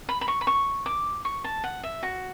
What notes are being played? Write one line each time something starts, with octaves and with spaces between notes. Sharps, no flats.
B5
B5
C#6
B5
C#6
D6
C#6
A5
F#5
E5
F#4